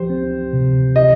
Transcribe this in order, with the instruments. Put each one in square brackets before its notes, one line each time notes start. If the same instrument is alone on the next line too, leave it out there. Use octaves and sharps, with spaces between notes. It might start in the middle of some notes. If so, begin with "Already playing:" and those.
Already playing: [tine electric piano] F3 G4 [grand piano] C5
[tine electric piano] C4
C3
[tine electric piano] G4 [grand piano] D#5